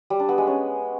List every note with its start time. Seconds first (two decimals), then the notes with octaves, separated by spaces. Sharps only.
0.10 G3
0.20 D4
0.29 B3
0.38 G#3
0.47 C#4